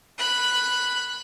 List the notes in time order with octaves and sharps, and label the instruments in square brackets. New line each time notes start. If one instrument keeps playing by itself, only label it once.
[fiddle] B5 F#6